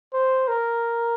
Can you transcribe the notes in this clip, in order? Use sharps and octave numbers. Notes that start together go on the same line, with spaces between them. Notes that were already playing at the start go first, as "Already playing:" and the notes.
C5
A#4